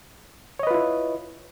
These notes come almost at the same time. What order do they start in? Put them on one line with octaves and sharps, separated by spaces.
C#5 D#5 B4 F4 E4